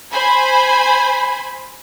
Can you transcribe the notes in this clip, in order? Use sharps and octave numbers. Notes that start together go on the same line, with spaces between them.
C5 G#5 B5